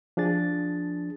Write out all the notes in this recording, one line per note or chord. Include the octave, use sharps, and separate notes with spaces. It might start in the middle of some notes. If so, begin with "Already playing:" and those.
F3 D4 G#4 A6